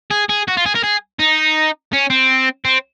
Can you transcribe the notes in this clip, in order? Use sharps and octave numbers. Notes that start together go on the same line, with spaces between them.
G#4
G#4
F#4
F4
G#4
A#4
G#4
D#4
C#4
C4
C4